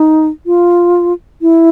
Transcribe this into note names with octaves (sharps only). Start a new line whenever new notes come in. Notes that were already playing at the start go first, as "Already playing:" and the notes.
Already playing: D#4
F4
E4